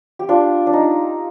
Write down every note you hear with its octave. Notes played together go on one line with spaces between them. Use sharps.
G4
D4 F4
D4
D#4